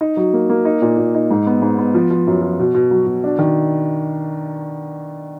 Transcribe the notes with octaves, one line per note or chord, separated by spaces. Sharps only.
D#4
F#3
A#3
A#3
D#4
A#2
A#2
D#4
G#2
B3
G#2
B3
F3
F3
F#2
F3
B2
B2
F#3
B2
D4
D#3